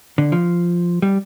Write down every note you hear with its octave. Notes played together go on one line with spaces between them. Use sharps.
D3
F3
G3